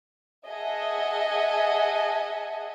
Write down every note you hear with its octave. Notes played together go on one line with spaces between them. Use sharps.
G#4 D#5 E5 F#5 G#5 A5